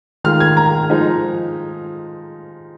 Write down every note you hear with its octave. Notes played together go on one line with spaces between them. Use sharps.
D#3 G#3 F4 F6
G#6
A#5
F3 G#3 D#4